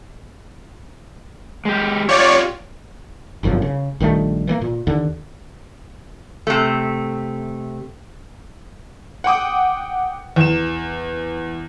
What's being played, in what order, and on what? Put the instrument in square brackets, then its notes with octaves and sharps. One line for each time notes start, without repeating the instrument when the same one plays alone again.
[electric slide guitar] G#3 G4
[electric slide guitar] F4 G4 [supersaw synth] C#5 D5
[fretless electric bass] G1 C2 F#2 F3
C#3
A#1 D#3 G3 A3
E3 G3 A#3
A#2
D#2 D3
[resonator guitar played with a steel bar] C3 A3
[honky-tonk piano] F#5 G5 D6 D#6
E2 E7